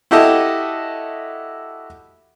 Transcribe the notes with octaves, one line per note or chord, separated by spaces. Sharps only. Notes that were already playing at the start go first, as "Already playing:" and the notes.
E4 F#4 G4 A4 D#5 E5